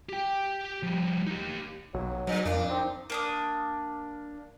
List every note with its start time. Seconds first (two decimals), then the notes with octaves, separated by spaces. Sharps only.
0.09 G4 G5
0.83 F3 G3
1.27 D#4 G4
1.94 B1 F#3
2.27 G2 F#3
2.45 F2 A#2 D4
2.70 C4 D#4
3.10 A#3 D4 D#6